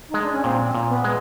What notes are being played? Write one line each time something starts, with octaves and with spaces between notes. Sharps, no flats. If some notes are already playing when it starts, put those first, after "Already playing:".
G#3 D#4
D4
C#4
A#2 C4
A#2
B3
G#3